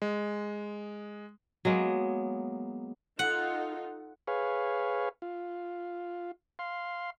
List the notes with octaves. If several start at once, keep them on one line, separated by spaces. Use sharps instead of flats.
G#3
F#3 G#3 A#3 B3
D#4 F4 A4 F#5
G#4 B4 C#5 F5
F4
F5 C6